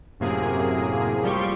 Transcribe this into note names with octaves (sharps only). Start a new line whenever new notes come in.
F#2 A2 C3 A#3 G#4
F3 G3 G4 C6 C#6 D7